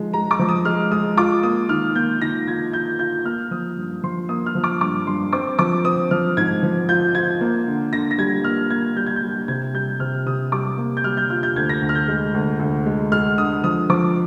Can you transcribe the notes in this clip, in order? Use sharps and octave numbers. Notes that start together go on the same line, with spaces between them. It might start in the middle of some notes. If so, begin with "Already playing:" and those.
Already playing: F3 G#3 D#4
G#3 A#5
D6
F3
D#6
G#3 F6
G#3 D#6
F4 D6
A#3 D#6
D#3 F6
A#3 G6
D#3 A#6
F4 G#6
F4 G6
F4 G6
A#3 F6
F3 D#6
G2
F3 C6
A#3 D#6
F6
F3
D6
G2 D6
G2 C6
C4 D6
F3 D6
C4 D#6
F3 F6
G#2 G#6
F3
F4 G6
F4 G#6
A#3
D3
D3 A#6
A#6
G3 G#6
A#3 F6
A#3 G#6
G3 G6
G#6
G6
G3
C3 G#6
G3 G6
C3 F6
C3 D#6
G3 D6
A#3
G6
G3 F6
G6
F4 F6
G6
D2 G#6
A#6
D2
F6
G6
G#3
D2
D2
G#3
G#3 F6
D3 D#6
F3 D#6
F3 D6